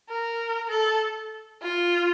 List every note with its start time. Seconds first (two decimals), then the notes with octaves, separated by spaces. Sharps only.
0.09 A#4
0.70 A4
1.62 F4